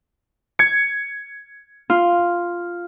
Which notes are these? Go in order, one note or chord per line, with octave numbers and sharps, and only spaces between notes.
G#6 C#7
F4